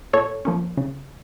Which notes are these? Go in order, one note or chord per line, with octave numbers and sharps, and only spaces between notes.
A#2 A4 C#5
F3 A#3 C#4
C#3